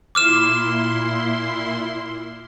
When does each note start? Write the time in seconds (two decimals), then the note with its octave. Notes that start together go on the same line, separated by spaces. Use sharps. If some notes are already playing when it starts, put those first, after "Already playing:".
0.15 A#2 E4 C6 D6 F6 E7